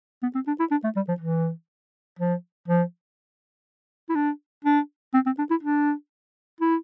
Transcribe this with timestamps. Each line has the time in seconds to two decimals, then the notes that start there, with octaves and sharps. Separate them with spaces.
0.22 B3
0.35 C4
0.47 D4
0.59 E4
0.71 D4
0.84 A3
0.96 G3
1.08 F3
1.20 E3
2.19 F3
2.68 F3
4.09 E4
4.15 D4
4.65 D4
5.14 C4
5.26 C4
5.38 D4
5.50 E4
5.63 D4
6.60 E4